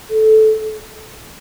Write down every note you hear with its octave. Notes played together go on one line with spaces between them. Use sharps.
A4